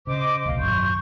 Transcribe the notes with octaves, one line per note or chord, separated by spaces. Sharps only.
C#3 C5 D#5 D6
D1 B1 A#2 F5
G#1 F#2 F#3 C6 C#6 G6